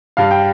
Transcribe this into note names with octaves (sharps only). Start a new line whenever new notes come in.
G2 F5
G5